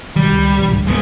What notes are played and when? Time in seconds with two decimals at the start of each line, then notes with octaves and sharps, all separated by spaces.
0.16 B1 D#3 G3
0.33 C#2
0.59 B1 A2 E3
0.72 G#1 D2 G2
0.87 G#3 B3